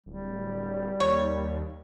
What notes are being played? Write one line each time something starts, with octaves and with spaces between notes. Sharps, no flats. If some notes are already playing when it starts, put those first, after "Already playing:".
D1 G3
D#2 C#5